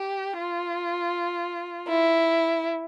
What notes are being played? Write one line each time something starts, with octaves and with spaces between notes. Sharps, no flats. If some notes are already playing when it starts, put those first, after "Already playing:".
Already playing: G4
F4
E4